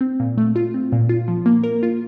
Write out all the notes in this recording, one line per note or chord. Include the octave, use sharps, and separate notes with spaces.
C4
A#2
A3
F4
C4
A#2
F4
F3
A#3
A#4
F4